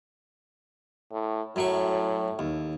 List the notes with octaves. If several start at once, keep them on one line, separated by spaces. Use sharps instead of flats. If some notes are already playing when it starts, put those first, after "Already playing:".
A2
F#2 A2 F#3 C#6
D#2